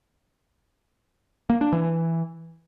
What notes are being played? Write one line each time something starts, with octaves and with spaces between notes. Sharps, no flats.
A#3
D4
E3